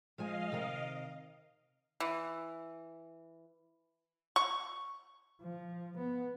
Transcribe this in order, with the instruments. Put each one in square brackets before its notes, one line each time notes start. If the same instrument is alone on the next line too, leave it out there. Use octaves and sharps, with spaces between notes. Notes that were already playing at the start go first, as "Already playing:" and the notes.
[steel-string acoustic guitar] F3 G#3 G#5 [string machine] D#5 F5
[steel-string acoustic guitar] C3 D#3 A#4
[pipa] E3
C#6
[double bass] F3
B3